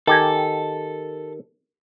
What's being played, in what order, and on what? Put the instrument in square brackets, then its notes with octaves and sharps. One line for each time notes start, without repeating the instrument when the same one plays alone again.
[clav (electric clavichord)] D#3 G4 G#5 [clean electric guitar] A4